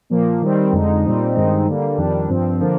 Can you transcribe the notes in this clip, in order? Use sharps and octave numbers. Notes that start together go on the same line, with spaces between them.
A#2 F3 A#3
D#3 G3 C4
F2 D3 G#3 D#4
A#2 G3 C4 D#4
G2 D#3 G#3 C4 D#4
D3 G3 A#3
F2 D#3 G3 D4
G2 F3 C4
D3 F3 A#3 D4